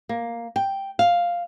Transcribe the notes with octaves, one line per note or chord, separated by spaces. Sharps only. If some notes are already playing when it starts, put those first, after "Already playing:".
A#3
G5
F5